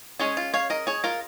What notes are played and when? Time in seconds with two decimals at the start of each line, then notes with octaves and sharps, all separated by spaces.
0.19 G#3 C#4 G#4 C#5
0.37 F4
0.54 C#5 F5
0.70 A#4 D#5
0.87 G#4 C#5
1.04 F4 A#4